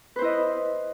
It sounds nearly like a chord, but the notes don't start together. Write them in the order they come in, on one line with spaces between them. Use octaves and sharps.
B4 C5 E4 D#5